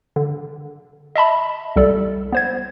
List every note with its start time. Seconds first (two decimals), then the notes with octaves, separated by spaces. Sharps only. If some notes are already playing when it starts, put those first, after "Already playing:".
0.16 D3
1.15 D#5 E5 A5 B5
1.76 C2 G3 A4 D5
2.32 B3 C5 G#6